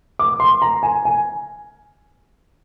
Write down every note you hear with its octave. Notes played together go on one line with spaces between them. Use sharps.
D6
C6
A#5
G#5
G#5